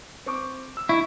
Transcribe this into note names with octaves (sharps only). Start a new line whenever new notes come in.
C4 C#6 D6
E6
E4 C#6